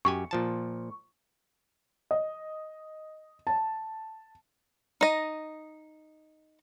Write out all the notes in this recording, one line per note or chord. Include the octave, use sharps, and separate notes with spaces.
F#2 G4 G#5 C#6
A#2 F3 A5
D#5
A5
D#4 D#5